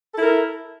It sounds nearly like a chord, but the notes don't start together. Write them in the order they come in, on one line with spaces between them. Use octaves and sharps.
A4 E4 A#4